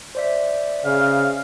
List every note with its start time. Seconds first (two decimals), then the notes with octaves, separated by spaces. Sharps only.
0.15 C5 D5 E5
0.85 C#3 F5